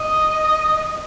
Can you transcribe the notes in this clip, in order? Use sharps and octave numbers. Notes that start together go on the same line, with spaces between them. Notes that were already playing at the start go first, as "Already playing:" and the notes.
Already playing: D#5